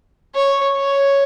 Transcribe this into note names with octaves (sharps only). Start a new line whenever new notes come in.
C#5
C#5